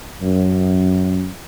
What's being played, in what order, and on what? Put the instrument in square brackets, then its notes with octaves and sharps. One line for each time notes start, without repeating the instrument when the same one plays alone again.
[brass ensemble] F#2